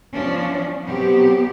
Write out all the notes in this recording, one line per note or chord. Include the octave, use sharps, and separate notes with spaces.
F3 C#4 D4
B2 F#3 B3 C4 G4